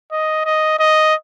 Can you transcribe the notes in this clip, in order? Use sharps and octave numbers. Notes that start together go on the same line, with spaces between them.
D#5
D#5
D#5